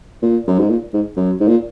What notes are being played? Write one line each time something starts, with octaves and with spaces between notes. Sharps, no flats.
A#2
F#2
G#2
A#2
G#2
F#2
G#2
A#2